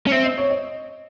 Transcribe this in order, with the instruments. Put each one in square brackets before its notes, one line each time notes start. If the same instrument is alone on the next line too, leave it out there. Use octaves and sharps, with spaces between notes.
[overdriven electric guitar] C#4
[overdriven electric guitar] C4 [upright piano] E5
[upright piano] D#5
C#5
D#5